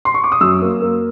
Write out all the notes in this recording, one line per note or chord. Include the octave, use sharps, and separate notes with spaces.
C6
C#6
D6
D#6
F#2 E6
A#3
A#3